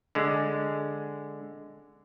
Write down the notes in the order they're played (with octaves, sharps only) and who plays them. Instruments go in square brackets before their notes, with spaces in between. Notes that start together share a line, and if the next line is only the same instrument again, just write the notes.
[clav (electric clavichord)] D3 G#3